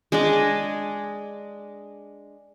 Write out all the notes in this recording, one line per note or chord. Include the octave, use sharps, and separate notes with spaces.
G#3 D4 G#4 D#5